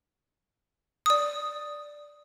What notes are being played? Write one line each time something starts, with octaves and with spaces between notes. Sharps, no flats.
D5 D#6